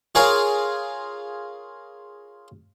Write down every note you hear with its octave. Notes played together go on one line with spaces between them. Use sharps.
F4 G#4 A#4 C#5 F5